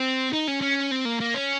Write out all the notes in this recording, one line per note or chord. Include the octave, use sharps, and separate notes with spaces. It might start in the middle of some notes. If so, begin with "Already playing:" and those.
Already playing: C4
D#4
C#4
C#4
C4
A#3
A#3
C#4